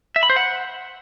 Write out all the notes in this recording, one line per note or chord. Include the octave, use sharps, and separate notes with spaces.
E5
B5
C5
F#5